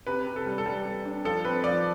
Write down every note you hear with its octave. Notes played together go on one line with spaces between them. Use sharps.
C3 B4
C3
A4
G3
A4
G3
G3
D4
F3 A4
C4 B4
F3 D5